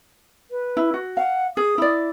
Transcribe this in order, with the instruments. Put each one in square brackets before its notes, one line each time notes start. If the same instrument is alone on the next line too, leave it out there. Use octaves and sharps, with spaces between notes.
[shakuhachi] B4
[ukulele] E4
F#4
[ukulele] F5 [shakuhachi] F#5
[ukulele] G#4 [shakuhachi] D#6
[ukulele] E4 D5